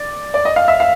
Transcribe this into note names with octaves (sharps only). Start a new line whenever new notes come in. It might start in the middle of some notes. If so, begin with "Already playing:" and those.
Already playing: D5
D5
D#5
F5
E5
F5